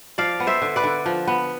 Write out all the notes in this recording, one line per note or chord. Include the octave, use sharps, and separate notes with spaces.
F3 D5 F5
B3
C5 E5
D3
B4 D5
D3
F3
B3